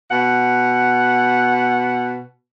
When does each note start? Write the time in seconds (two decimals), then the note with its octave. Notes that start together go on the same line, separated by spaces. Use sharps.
0.11 B2 F#5